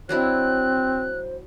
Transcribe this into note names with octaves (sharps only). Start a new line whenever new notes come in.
F#3 C4 D4 E4 C5 F#6